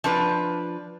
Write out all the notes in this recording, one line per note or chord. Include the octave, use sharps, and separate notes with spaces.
F3 D4 B4